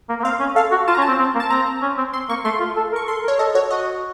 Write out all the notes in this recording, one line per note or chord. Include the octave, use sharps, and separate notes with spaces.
A#3
A#3
C4 F5
C#4
A4 F5
F#4
F4 A5
A#5
C#4
A5
C4
C4
A#3
A5
C4 A#5
C#4
C4
C4 C6
A#3 C#6
A3 C6
F4
A4
A#4
C#6
A4 C6
A#4
C#5
A4 D#5
F#4 C#5
F#4 D#5